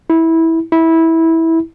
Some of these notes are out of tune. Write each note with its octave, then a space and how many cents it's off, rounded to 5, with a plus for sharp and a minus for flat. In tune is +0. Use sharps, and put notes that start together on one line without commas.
E4 -15
E4 -15